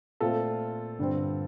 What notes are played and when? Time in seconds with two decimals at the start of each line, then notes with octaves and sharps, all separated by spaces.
0.21 A#2 A3 C4 F4 A4
0.99 G2 D3 G3 C4